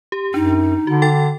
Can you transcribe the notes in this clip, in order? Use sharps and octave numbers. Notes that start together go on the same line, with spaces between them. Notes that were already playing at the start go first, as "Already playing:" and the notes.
G4
F#2 D4 D#4
D3 F#4
A4 G5 A6